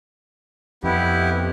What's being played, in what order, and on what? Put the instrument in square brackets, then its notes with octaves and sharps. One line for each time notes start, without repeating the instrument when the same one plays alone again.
[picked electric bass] F2 [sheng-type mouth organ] B3 E4 G4